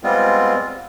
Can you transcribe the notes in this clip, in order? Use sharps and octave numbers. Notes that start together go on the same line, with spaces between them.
G3 G#3 B3 C4 F4